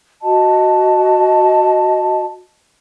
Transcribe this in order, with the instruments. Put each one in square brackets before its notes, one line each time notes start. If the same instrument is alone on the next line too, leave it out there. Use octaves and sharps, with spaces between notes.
[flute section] F#4 D#5 A5